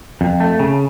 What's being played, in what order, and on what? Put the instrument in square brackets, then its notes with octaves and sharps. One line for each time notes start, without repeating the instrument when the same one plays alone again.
[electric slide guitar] F2
A3
C#3